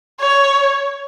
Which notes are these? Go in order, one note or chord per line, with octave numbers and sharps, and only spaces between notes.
C#5